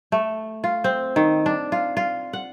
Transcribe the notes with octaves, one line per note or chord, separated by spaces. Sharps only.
A3
F4
C4
D#3
D4
F4
F4
F#5